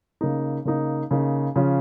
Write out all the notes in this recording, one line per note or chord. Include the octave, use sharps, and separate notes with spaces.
C#3 A#3 D#4
C#3 A#3 D#4
C#3 A#3 D#4
C#3 F3 C#4 F4